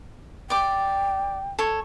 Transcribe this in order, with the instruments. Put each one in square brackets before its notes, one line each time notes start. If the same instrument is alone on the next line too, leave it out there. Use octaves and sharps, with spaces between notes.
[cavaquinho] D5 D6 [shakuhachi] G5
[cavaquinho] A4 C#5